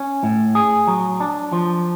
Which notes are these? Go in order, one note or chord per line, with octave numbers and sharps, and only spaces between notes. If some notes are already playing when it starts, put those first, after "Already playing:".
Already playing: C#4
A2
G#4
F#3
D4
F3